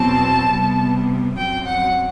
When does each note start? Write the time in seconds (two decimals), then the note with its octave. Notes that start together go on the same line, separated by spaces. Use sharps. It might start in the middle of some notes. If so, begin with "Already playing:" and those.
Already playing: E2 B2 F#3 C4 A5
0.49 C3 G3 B3
1.37 F#2 F#3 C4 G5
1.65 F#5